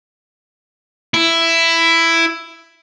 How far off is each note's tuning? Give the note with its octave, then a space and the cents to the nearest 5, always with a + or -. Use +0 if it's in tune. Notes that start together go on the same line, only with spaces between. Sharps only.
E4 +10